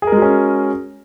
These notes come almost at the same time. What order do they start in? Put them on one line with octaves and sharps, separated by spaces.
G#4 A#4 G#3 F#4 C#4